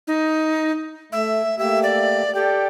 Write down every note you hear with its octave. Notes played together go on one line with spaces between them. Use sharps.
D#4
A3 E5
A3 A#3 G4 E5
D5
G4 A4 D5 G5